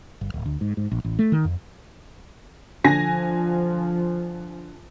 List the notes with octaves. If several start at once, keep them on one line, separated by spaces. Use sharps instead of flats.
G1
D1
D2
G#2
G#2
A#1
A1
A3
D#3
F2
D3 F3 G#5 A#6